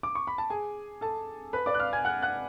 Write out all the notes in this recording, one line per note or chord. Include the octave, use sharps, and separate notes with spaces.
D6
C#6
B5
A5
G#4 G#5
A4 A5
B4 B5
D5 D6
F#6
F5 F6
G#5 G#6
F#5 F#6
F#5 F#6